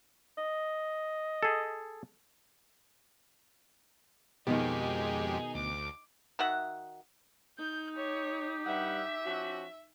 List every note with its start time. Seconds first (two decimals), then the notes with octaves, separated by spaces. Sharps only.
0.38 D#5
1.43 G#4 A4
4.47 F2 B2 D#3 G#3 D#4 G4 G#4
5.55 D2 D6
6.39 D#3 F#4 E5 F#5
7.58 D#4 G6
7.96 G4 C#5
8.66 G2 G3 E5 F#5
9.25 F3 C#4 F#4